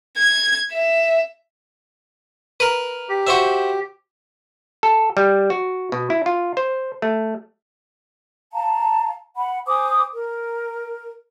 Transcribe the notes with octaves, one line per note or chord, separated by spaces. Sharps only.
G#6
E5
A#4 B4
G4
F#4 C5 E5
A4
G3
F#4
B2
E4
F4
C5
A3
F5 A5 A#5
F#5 B5
C5 G#5 D6 D#6
A#4